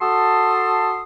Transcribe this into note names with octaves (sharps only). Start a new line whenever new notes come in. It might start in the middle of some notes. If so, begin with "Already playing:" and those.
F#4 A4 A5 C6 D#6